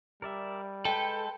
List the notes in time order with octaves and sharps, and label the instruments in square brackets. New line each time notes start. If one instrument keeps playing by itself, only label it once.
[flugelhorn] G3 [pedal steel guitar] A#4 D5 E5
[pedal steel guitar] G#3 B4 [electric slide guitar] A4 [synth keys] G5